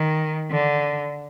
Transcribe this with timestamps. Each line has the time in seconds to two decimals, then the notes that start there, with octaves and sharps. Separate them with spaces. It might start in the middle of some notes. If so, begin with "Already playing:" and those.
Already playing: D#3
0.51 D3